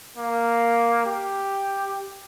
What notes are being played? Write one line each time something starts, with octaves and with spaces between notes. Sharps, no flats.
A#3
G4